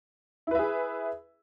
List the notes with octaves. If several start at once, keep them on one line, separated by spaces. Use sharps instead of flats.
E4 G#4 B4 E5